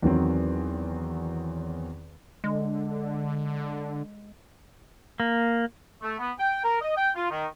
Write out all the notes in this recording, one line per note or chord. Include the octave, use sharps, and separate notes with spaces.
E2 D#3 F#3 C4
D3 G#3
A#3
A3
B3
G5
A#4
D#5
G5
F4
D#3